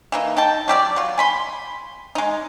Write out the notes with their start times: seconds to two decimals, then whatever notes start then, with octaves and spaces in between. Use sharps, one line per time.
0.12 E3 A#3 D#4
0.37 D#4 G5 A5
0.68 F#3 G4 A4 D5
0.96 F#3 F4
1.18 G#5 B5 C6
2.15 G#3 D#4